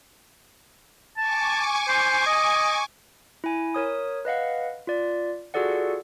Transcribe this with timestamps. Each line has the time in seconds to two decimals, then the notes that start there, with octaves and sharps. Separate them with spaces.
1.17 G#5 A5 C#6 D6
1.88 C5
2.27 D#5
3.44 E4 G#5
3.75 A#4 C#5 D#6
4.25 B4 D#5 F5 F#5
4.87 F4 D5
5.54 F4 F#4 G#4 A4 D5 F#5